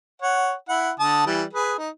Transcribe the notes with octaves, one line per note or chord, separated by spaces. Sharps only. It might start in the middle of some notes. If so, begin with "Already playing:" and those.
C#5 F#5
E4 F#5
D3 A5 D#6
E3 G3
G#4 B4
D#4